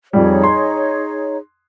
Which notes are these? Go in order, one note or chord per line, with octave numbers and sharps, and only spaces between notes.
F2 G3 D#4 G#4 C#5
C6